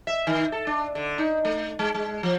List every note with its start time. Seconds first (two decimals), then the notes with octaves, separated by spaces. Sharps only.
0.07 E5
0.27 D#3
0.52 A4
0.67 D4
0.95 D3
1.18 D#4
1.45 A3
1.79 G#3
1.95 G#3
2.23 F3